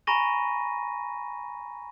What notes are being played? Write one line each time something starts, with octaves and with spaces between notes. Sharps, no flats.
G#5 A#5 B5 C#6 A#6 D#7